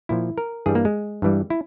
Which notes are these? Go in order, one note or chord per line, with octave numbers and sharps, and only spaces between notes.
A#2 F3 E4
A#4
G2 E3 G3 G#4
A#3
G#3
G2 E3 G3
E4